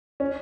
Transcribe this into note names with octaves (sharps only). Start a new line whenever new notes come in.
C#4